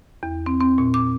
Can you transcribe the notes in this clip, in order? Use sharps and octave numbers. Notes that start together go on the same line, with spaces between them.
E2
C4
C4
A#2
D6